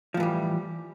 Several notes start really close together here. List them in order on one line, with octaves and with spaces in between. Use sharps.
F3 A2 E3 G3